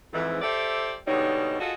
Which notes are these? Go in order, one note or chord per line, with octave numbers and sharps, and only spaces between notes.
F2 G#2 E3
G4 A4 C5 D5 E5
G#2 B2 D3 G3 D#4 C#5
F4 F#4 G#4 A4 D#5